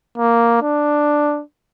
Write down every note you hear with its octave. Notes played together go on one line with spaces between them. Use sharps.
A#3
D4